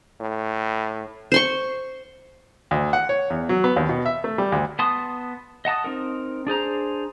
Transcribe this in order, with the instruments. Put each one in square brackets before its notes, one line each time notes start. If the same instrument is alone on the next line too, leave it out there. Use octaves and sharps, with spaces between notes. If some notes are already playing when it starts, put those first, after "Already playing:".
[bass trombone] A2
[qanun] C5 C6 C#6
[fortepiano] D2
F#5
C#5
E2
F#3
B3
D#2
B2
E5
A3
G3
D2
[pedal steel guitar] B3 A5 C6 D#6
D#5 F#5 A5 D#6
C4 D#4 A#4
D4 G#4 C5 A#5